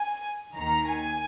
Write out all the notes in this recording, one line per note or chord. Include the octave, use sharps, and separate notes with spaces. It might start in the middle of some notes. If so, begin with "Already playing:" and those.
Already playing: G#5
D#2 D#3 A#5
G#5